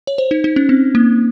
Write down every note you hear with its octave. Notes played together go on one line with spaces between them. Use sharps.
C#5
C5
D#4
D#4
C#4
C4
A#3